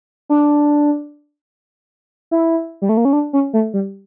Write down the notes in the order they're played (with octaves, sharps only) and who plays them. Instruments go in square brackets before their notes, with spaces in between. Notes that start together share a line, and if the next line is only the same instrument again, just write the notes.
[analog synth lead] D4
E4
G3
A3
A#3
C#4
D4
C#4
A3
G3